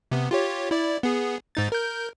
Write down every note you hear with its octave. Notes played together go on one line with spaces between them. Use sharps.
C3 B3
F4 G4 C#5
E4 D5
B3 G#4
G#2 D#4 A6
A#4 G6